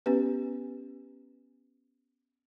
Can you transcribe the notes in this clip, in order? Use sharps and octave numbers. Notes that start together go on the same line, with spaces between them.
B3 C#4 G4 B4